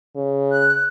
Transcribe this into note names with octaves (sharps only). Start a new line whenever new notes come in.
C#3
F#6